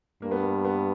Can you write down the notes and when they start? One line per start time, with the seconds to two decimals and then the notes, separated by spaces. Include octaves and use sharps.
0.22 G2 A#3
0.31 B3
0.40 A#3
0.65 B3